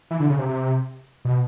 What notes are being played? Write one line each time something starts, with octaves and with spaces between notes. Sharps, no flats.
E3
D3
C#3
C3
C3
B2